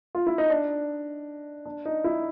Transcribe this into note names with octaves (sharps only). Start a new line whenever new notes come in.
F4
E4
D#4
D4
D4
D#4
E4